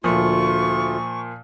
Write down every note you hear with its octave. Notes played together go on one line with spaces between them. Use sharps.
D2 A#2 F3 A3 F4 C#6